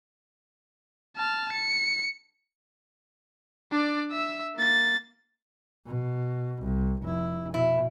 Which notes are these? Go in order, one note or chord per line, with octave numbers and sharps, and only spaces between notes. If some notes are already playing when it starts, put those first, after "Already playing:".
A5 F6
C#7
D4 D5
E5 E6
A#3 A6
B2
C2
F1 E4
B2 E4